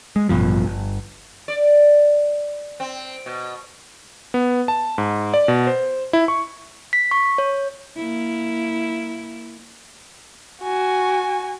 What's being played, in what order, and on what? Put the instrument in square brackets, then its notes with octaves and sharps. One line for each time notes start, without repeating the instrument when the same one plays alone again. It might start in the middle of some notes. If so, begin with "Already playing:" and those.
[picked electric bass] G#3
A1 G2 B2 F3
G1
[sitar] D5
C4
B2
[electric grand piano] B3
A5
G#2
D5
B2
C5
E4
C#6
[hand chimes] B6
C#6
C#5
[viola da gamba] A#3 E4
[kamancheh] F#4 G#5